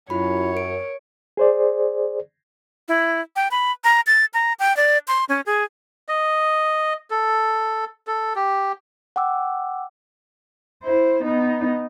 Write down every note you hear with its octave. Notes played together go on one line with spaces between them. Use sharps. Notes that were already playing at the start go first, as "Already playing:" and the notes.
F#2 E4 F4 C#5 B5
A#4 D7
G#4 C5 D5
E4
G5
B5
A#5
A6
A#5
G5
D5
C6
C#4
G#4
D#5
A4
A4
G4
F#5 G5 D6 E6
E4 C5
B3 D#4